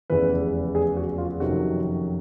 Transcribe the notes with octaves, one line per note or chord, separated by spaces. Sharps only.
F1 E2 C#3 E3 B4
G#4
F#4
F4
F#1 F2 C3 D#3 F#3 F#4